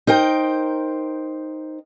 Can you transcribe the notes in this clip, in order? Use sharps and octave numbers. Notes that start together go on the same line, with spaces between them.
D#4 A#4 C5 G5